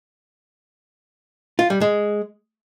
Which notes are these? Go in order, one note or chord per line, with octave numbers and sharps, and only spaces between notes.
F4
G3
G#3